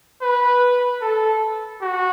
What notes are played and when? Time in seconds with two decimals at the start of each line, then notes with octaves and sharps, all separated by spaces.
0.22 B4
1.02 A4
1.82 F#4